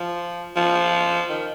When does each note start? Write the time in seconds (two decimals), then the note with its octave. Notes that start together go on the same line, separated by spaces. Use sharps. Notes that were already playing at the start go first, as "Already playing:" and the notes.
Already playing: F3
0.56 F3
1.30 D#3